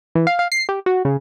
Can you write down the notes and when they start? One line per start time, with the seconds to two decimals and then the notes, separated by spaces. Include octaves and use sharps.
0.15 E3
0.27 F5
0.39 F5
0.52 C7
0.69 G4
0.86 F#4
1.05 C#3